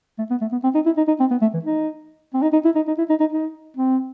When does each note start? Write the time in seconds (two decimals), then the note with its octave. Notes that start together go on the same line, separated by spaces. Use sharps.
0.18 A3
0.30 B3
0.41 A3
0.52 B3
0.64 C4
0.75 D#4
0.86 E4
0.97 D#4
1.08 D#4
1.20 C4
1.31 B3
1.41 A3
1.54 E3
1.65 D#4
2.34 C4
2.42 D#4
2.53 D#4
2.65 E4
2.76 D#4
2.87 D#4
2.98 E4
3.10 D#4
3.20 D#4
3.32 D#4
3.76 C4